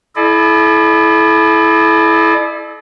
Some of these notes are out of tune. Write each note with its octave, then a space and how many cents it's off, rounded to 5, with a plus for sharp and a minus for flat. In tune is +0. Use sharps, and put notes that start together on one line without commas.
E4 +0 A4 -40 D5 +40